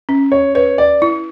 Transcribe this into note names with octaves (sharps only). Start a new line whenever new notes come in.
C#4
C#5
B4 C#5
D5
E4